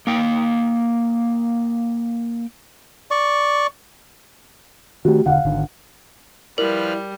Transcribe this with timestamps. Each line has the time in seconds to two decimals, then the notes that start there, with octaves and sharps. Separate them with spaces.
0.07 A#3 G5
3.11 D5 C#6
5.05 D#3 A3 F#4 G4
5.26 E1 D3 F5 F#5
5.45 G#1 D3 D#3
6.58 F3 G3 E4 A#4 B4 D5 F6